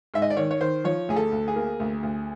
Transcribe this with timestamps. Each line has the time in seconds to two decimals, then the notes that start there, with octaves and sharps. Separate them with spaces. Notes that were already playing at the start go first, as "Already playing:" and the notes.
0.14 G#2 E5
0.22 D#5
0.30 D5
0.37 D#3 C#5
0.51 C#5
0.61 D#3 C5
0.84 F3 C#5
1.09 D2 G#4
1.16 A4
1.32 D2
1.48 G#4
1.56 A#3
1.80 D2
2.03 D2